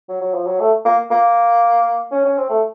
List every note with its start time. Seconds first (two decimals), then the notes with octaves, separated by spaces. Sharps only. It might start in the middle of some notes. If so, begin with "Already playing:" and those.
0.09 F#3
0.21 F#3
0.34 F3
0.47 F#3
0.60 A3
0.85 A#3
1.11 A#3
2.11 C#4
2.25 C#4
2.37 C4
2.50 A3